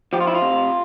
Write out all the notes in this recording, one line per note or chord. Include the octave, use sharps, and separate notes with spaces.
F3 G4
F4
E4
F4
C3